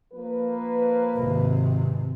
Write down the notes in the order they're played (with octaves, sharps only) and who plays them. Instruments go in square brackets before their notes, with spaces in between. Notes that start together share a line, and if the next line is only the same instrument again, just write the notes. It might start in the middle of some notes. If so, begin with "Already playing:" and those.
[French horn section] F3 A#3 B4
[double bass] G#1 C3